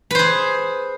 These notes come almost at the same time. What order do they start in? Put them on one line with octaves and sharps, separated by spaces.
B4 C5 G#4